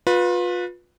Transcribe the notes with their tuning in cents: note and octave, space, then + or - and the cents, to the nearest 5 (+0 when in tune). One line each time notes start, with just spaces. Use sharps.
F4 +30 B4 -10